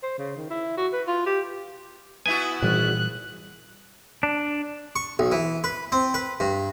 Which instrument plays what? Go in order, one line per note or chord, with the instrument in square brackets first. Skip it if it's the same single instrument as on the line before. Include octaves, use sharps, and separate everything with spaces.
[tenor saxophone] C5
C#3
D#3
E4
F#4
B4
F4
G4
[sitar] B3 E4 F#4 [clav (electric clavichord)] G#5
[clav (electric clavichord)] G#1 [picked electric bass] A#2 E3 G3 [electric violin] F#6
[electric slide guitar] D4
[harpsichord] C#6
B1
E3
B4
C4
B4
G2